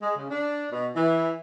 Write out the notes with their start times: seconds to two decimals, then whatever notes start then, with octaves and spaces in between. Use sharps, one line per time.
0.02 G#3
0.17 C#3
0.30 D4
0.72 B2
0.95 E3